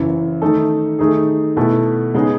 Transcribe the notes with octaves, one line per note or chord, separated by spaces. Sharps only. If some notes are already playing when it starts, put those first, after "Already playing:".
Already playing: F#1 F#2 E3
D#3 A3 D#4 A4
D#3 A3 D#4 G#4
B2 A3 E4 A4
C#3 G#3 B3 D#4 G#4